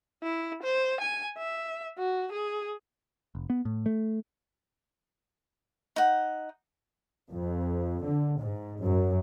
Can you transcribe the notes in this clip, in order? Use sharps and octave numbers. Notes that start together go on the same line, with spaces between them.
E4
C5
G#5
E5
F#4
G#4
F1
B3
A2
A3
D#4 F#5
F2
D3
G#2
F#2